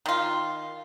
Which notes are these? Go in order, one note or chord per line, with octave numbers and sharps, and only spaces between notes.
D#3 F4